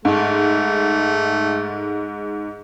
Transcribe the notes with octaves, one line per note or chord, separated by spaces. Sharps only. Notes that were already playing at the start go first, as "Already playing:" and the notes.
G#2 A3